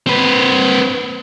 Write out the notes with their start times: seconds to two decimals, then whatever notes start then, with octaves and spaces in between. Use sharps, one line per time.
0.07 C4 B4